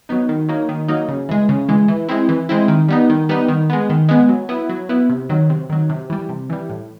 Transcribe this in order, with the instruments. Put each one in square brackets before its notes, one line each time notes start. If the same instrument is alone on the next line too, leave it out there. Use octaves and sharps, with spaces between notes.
[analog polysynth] F#3 B3 D#4
D#3
F#3 A#3 D#4
D#3
F#3 A#3 D#4
C#3
E3 G#3
C#3
E3 G#3
E3
G#3 C4 E4
E3
G#3 C4 E4
D#3
G3 B3 D#4
D#3
G3 B3 D#4
D#3
G#3 B3
D#3
G#3 B3
F#3
B3 E4
F#3
B3 E4
C3
D#3 F#3
C3
D#3 F#3
C3
E3 G3
C3
E3 G3
A2